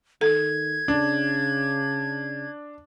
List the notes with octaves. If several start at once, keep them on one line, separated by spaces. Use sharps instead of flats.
D#3 A4 G#6
C#3 D4